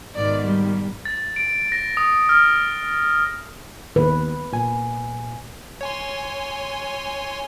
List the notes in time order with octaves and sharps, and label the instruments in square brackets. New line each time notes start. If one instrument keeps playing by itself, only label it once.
[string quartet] G#2 B2 D#3 [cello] D5
[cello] G3
[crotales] A6
D7
A#6
D#6
F6
[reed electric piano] D#2 [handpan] B4
[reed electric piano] A#2 G#5
[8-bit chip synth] C#5 G#5 C6